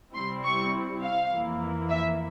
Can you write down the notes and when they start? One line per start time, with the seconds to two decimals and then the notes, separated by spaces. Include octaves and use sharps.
0.14 C3 G3 C4 E4 C6
0.44 C#6
1.02 F5
1.31 F2 E3 A#3 E4
1.89 E5